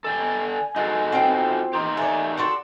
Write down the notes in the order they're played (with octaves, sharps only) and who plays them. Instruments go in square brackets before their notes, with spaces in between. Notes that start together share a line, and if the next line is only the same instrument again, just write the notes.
[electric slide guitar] A4 D5 G5 [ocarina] G#5
[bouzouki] G#3 [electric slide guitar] D#4 F#4 A4
[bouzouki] C4 F4 G5
[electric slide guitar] D#4 G4 [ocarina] C6
[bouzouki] A3 D5 [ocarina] G#5
[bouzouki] D4 F#4 A4 [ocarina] C6